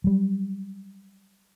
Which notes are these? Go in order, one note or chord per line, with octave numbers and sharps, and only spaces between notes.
F#3 G3